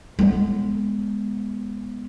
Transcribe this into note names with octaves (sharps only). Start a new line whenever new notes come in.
G#3 B3